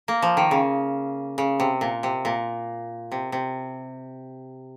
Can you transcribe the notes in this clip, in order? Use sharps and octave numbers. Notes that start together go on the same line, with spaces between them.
A#3
F3
D#3
C#3
C#3
C3
A#2
C3
A#2
C3
C3